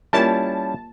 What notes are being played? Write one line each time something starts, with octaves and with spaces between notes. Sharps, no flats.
G3 A#3 C#4 E4 F4 A#4 A5